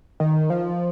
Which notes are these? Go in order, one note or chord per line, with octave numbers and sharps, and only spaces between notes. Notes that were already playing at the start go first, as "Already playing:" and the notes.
D#3
F3